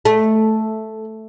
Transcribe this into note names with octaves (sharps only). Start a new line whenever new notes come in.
A3